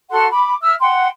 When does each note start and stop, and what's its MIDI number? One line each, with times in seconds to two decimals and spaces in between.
0.10 0.26 66
0.10 0.26 69
0.10 0.26 78
0.10 0.26 84
0.31 0.53 83
0.31 0.53 86
0.61 0.73 76
0.61 0.73 88
0.61 0.73 89
0.80 1.07 78
0.80 1.07 79
0.80 1.07 84